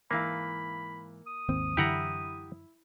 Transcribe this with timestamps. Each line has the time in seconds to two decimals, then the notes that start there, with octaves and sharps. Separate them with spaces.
0.11 G#2 E3 A#3 F5 B5
1.26 D#6
1.49 G#1 D#2 C4
1.77 F#2 D3 E3 E4 G4 F#5 A#5